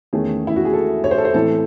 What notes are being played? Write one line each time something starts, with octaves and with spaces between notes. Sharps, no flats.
E2 D#3 A3 C#4 G#4
E4
F#4
G#4
A4
C#5
C5
A4
C5
A2 E3 C4 A4